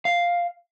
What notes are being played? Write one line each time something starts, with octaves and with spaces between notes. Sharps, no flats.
F5